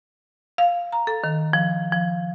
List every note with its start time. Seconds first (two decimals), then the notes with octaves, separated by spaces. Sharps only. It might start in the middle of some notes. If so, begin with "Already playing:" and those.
0.58 F5
0.92 A#5
1.07 A4
1.24 D#3
1.53 F3
1.92 F3